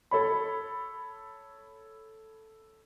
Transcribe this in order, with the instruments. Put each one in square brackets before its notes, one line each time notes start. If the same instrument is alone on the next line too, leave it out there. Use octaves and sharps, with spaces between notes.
[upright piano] A4 C#5 B5